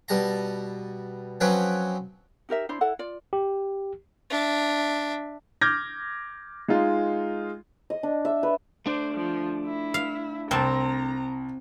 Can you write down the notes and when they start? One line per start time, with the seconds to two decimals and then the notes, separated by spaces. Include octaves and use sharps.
0.08 B2 G3 A5 A#5
1.41 F3 F#3 C4 C#4 B4 G5
2.49 D#4 G4 A#4 E5
2.69 D4 E4 C5 B5
2.81 E4 A4 F#5
2.99 F4 D5
3.33 G4
4.30 D4 E5
5.61 D6 F6 G6 G#6 A#6
6.68 G#3 D#4 F4
7.90 D#5
8.03 D4
8.25 E5
8.43 B4
8.86 A3 D4 C5 D5
9.15 F3
9.65 E4
9.94 F5
10.51 C2 C4 A5 A#5